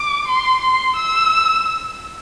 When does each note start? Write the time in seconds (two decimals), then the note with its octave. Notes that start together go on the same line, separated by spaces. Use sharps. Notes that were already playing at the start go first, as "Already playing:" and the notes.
Already playing: D6
0.28 C6
0.62 C6
0.96 E6